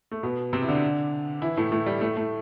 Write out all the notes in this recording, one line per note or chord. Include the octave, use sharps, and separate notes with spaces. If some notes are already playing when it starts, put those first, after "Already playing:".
A3
B2 B3
C3 C4
E4
D3 D4
E3 E4
A2 A3
A2 A3
G3
A2 A3
A2 A3